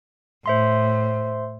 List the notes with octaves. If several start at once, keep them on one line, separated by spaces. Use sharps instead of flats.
A2 C5 E5 C6